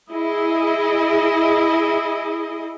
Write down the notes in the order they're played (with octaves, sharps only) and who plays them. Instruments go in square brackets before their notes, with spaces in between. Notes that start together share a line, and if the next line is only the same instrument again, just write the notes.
[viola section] E4 G#4 D#5